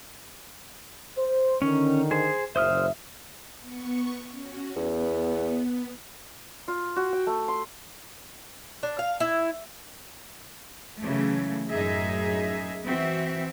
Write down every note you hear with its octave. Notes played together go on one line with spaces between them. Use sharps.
C5
D3 D#3 C#4
G#4 C5
F#1 A#2 C5 E5 D#6 F6
B3 C#6
C#4 F#4
E2 B3
F4
F#4
G5
A3
C6
D4
F5
E4
C#3 E3 F#3 A3
F#2 A2 D#4 G#4 E5
E3 C4 F#4 E5